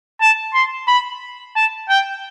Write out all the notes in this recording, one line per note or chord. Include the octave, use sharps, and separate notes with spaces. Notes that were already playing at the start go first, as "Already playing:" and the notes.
A5
C6
B5
A5
G5